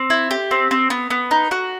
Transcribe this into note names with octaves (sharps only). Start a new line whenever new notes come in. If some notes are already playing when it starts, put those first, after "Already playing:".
Already playing: C4
E4
G4
C4
C4
B3
B3
D#4
F#4